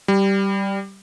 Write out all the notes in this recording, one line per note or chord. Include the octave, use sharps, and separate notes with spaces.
G3